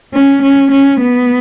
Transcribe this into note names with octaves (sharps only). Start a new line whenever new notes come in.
C#4
C#4
C#4
B3